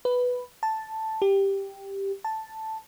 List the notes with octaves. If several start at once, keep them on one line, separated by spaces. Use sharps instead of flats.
B4
A5
G4
A5